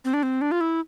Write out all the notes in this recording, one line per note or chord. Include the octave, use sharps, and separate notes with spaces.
C4
D4
C4
D4
F4
E4